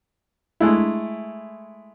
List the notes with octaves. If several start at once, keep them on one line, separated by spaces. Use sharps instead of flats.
G#3 A3 E4